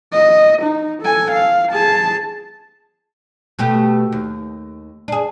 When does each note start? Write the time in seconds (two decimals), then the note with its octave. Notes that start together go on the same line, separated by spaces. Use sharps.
0.12 D#5
0.62 D#4
1.02 A4 G#5
1.31 F5
1.72 G#4 A5
3.59 B2 A3 G4
4.12 D#2
5.08 D4 G#4